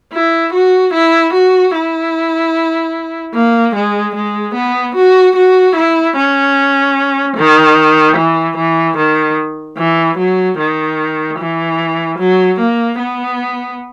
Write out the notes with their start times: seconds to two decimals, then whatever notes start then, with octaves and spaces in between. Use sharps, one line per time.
0.13 E4
0.53 F#4
0.94 E4
1.33 F#4
1.74 E4
3.34 A#3
3.75 G#3
4.15 G#3
4.55 B3
4.95 F#4
5.36 F#4
5.76 E4
6.17 C#4
7.37 D#3
8.17 E3
8.57 E3
8.97 D#3
9.78 E3
10.18 F#3
10.58 D#3
11.39 E3
12.19 F#3
12.60 A#3
12.99 B3